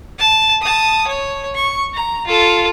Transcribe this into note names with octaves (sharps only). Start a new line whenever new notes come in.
A5
A5 D#6
C#5
C#6
A#5
F4 A4